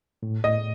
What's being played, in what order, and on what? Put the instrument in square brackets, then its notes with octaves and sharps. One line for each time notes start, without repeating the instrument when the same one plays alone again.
[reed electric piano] A2
[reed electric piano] A2 [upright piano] D#5